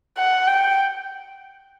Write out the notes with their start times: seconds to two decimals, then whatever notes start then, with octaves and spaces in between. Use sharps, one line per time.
0.17 F#5
0.48 G5